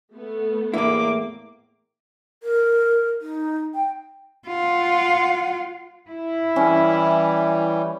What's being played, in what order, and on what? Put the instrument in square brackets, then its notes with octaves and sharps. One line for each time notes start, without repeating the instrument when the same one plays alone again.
[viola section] A3 B3
[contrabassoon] E2 [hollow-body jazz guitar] A2 E4 [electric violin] A#3 D6
[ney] A#4
D#4
G5
[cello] F4 F#5
[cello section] E4
[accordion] E3 G3 [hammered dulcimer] C#4